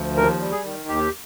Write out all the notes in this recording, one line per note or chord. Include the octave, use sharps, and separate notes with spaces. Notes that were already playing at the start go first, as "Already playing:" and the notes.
Already playing: D2 F3
D#2 A#4
G3
G#4
D#3
D#2 G4